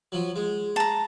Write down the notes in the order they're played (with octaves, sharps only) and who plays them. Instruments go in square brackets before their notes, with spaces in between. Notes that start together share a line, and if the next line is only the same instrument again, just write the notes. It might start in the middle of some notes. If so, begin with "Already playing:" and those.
[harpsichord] F3 F#3
G#3
[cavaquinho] A5 A#5